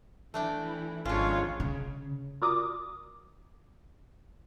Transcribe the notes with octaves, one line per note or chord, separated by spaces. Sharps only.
E3 A3 D4 E4 G5
G#1 F3 G#3 C#4 D4 F4 G#4 C#5
C#3
F4 F#4 A#4 D5 D6 D#6